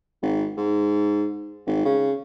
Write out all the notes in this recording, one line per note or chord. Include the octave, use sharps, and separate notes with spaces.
G#1
G#2
G#1
C#3